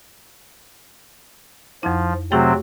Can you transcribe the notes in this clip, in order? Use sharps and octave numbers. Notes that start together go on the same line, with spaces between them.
F2 F3 E4
C3 F#3 A3 C4 F#4 G#4